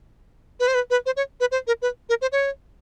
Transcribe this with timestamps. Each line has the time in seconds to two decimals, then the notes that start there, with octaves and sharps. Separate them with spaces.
0.60 B4
0.68 C5
0.75 B4
0.90 B4
1.06 C5
1.17 C#5
1.40 B4
1.52 C5
1.67 A#4
1.82 B4
2.09 A#4
2.22 C5
2.32 C#5